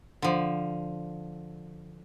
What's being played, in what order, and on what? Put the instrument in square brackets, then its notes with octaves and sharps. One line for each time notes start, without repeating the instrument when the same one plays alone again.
[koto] D3 F3